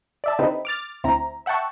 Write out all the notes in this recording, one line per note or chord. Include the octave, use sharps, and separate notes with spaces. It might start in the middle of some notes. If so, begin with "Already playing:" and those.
D5 E5 A5
D3 C4 D#4 E4 G4 B4
D6 F6 A6
D2 C4 E4 A#5
E5 F#5 G5 A5 C#6